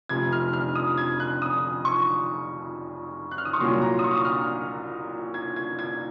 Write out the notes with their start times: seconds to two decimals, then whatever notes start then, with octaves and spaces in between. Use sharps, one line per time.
0.09 F1 F2 C3 G#6
0.33 F6
0.53 F6
0.75 D#6
0.98 G#6
1.20 F#6
1.42 D#6
1.85 C#6
3.31 F#6
3.38 F6
3.45 D#6
3.53 C#6
3.60 C2 A#2 F#3 C6
3.81 A#5
3.99 D#6
4.04 C#6
4.16 D#6
4.25 F6
5.34 G#6
5.56 G#6
5.79 G#6